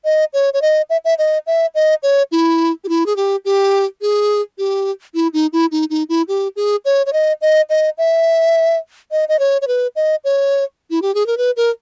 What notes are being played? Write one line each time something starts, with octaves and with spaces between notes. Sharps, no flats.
D#5
C#5
C#5
D#5
E5
E5
D#5
E5
D#5
C#5
E4
G4
E4
G#4
G4
G4
G#4
G4
E4
D#4
E4
D#4
D#4
E4
G4
G#4
C#5
C#5
D#5
D#5
D#5
E5
D#5
D#5
C#5
C#5
B4
D#5
C#5
E4
G4
G#4
A#4
B4
A#4